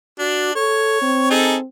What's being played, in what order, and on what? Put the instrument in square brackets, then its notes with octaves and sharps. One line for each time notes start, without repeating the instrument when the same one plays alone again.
[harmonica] D4 [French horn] F#4
[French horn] A4 [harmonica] C#5
[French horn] C4
[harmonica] D#4 G#4 A4